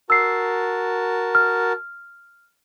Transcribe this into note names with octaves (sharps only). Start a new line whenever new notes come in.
F#4 A#4 A5 E6 C7
F6